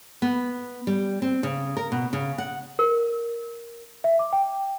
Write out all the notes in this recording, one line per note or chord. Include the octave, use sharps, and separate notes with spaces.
B3
G3
C4
C#3
A#4
B2
C#3
F#5
A#4
E5
D6
G5